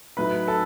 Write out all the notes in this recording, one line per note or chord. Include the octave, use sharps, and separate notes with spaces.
A2 F#3 A3 D#4 B4 B5
A4 A5